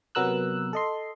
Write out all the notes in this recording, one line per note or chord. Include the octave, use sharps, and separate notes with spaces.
C3 F#3 B3 A#4 E6 F#6
A4 D#5 C6